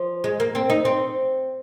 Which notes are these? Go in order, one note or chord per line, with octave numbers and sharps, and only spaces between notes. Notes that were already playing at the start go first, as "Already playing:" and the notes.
Already playing: F3
G#3
A#3
C4
D#4
C4